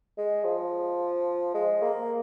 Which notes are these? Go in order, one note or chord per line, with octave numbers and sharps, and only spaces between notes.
G#3
F3
G#3
A#3